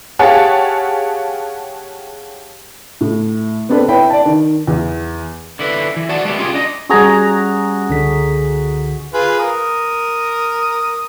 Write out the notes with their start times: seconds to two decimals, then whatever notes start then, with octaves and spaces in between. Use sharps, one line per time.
0.19 G4 G#4 C#5 F5 F#5 A5
3.01 A2
3.69 B3 C4 D4 A4 B4
3.89 E4 B4 C#5 E5 G5 B5
4.10 D5 A5
4.26 D#3
4.67 E2
5.59 D3 E4 B4
5.96 E3
6.09 F#4 D5 F#5 A5
6.25 G#3 B3 E4 G4
6.39 C#4 F4 G4 G#4
6.53 D4 D#5
6.90 G3 C#4 F#4 G#4 A#5
7.89 C#2 D3 B6
9.14 F4 G#4 B4
9.40 A#4 D#6